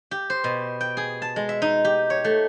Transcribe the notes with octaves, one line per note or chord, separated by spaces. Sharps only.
G4
C5
B2
G5
G#4
A5
G#3
E5
D#4
G4
C#5
A3